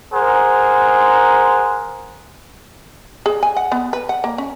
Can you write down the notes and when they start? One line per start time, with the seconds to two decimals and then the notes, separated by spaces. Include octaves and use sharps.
0.14 G#4 A#4 C5 F#5
3.26 G#4
3.43 G#5
3.57 F#5
3.72 B3
3.93 B4
4.09 F#5
4.24 A#3
4.38 C#4